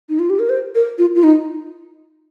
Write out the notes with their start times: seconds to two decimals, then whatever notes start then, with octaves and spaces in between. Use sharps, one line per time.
0.09 D#4
0.19 F4
0.30 G4
0.39 A#4
0.49 C5
0.75 A#4
0.98 F4
1.15 F4
1.24 D#4